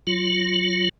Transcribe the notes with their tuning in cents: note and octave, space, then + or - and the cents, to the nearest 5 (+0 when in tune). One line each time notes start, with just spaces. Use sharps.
F#3 +0 F4 +0